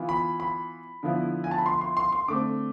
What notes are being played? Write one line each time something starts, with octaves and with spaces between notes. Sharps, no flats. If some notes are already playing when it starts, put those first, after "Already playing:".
Already playing: E3 B3 F4
B5
B5
D3 F3 B3 E4
G#5
A5
B5
C6
C6
C6
C6
D3 A3 C4 D6